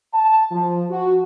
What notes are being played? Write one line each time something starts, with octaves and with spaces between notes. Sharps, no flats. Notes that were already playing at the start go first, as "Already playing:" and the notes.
A5
F3
F#4